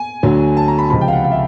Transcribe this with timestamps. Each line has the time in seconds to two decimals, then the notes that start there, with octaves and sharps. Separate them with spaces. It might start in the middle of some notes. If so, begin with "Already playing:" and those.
Already playing: G#5
0.23 D2 D3 F#3
0.57 A5
0.68 A#5
0.78 B5
0.90 C#2 C3 F3 B5
1.01 G5
1.08 F5
1.13 F#5
1.24 F5
1.32 E5